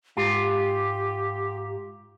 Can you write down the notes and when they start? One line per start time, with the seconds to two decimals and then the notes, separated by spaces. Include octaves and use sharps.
0.17 G#2 F4 G4